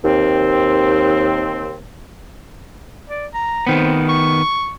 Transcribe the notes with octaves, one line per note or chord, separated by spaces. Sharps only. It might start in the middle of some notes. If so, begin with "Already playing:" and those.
D#2 C4
D5
A#5
D#3 B3 C4
C#6